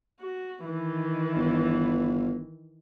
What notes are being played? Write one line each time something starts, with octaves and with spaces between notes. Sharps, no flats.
F#4
D#3 E3
G1